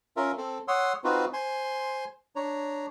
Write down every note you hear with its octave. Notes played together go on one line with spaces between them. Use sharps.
C#4 F4 A#4 E5
C4 A4
C#5 F#5 C6 D#6 E6
C4 D#4 F4 F#4 B4
C5 G#5 C6
D4 C#5 A#5